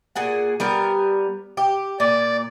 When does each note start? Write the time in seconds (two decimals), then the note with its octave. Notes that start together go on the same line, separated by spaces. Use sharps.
0.16 A#2 G#4 F#5
0.60 G3 B3 A#4
1.57 G4
2.00 A#2 D5